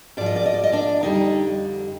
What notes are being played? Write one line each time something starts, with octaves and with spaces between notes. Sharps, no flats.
G#2 F3 D5
D#5
D5
D#5
D5
D#5
D4 D5
F2 D3 G3 D#4 D#5